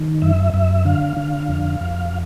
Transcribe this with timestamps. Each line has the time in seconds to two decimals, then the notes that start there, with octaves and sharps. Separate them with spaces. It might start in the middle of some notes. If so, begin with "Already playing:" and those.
Already playing: D#3
0.22 F#2 E5
0.54 F#2 E5
0.85 D3 F5
1.17 D3
1.49 F2
1.80 F2